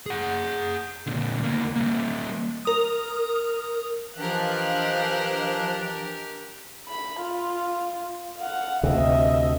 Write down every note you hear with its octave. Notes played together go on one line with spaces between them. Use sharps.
G#4 F#5
A#2 D3
D2 A#3
G3 A#3
A#4 D#6
E3 F3 D4 G4 A#4 D#5 F5 F#6
B5
F4
F5 F#5
D2 C3 D#5 E5